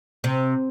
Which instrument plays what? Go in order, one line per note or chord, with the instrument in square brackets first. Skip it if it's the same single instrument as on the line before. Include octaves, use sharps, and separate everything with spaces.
[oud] C3